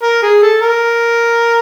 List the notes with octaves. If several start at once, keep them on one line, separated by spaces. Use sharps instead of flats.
A#4
G#4
A4
A#4